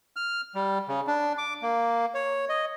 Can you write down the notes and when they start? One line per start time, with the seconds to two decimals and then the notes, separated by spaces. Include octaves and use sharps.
0.16 F6
0.55 G3
0.89 C#3
1.08 D4
1.38 D6
1.62 A#3
2.14 C#5
2.49 D#5